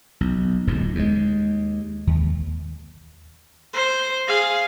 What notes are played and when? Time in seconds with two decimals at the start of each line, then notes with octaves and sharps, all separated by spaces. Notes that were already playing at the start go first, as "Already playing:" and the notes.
0.21 B1
0.67 D1 B1 F2 G#2
0.95 D#2 G#3
2.07 D#2
3.73 C5
4.27 G#4 F5